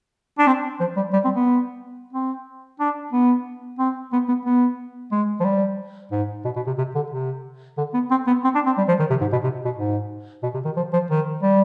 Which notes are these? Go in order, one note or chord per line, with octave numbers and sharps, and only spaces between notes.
D4
C4
F3
G3
G3
C4
B3
C4
D4
B3
C4
B3
B3
B3
G#3
F3
G3
G#2
B2
B2
C3
C3
D3
C3
D3
B3
C4
B3
C4
D4
C4
G3
F3
D#3
C3
G#2
B2
C3
B2
G#2
B2
C3
D#3
F3
F3
D#3
G3